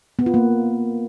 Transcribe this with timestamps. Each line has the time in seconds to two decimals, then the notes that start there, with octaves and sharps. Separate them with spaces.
0.19 B3
0.26 F4
0.34 A#3